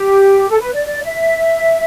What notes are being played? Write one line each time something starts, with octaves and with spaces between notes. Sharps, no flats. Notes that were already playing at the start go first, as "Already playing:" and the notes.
Already playing: G4
A4
B4
D5
D5
E5